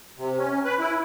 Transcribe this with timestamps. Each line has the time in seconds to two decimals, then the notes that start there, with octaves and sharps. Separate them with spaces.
0.18 C3
0.38 C#4
0.65 B4
0.79 E4